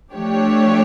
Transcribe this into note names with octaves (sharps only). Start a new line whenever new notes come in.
F3 A3 D4 G4 C#5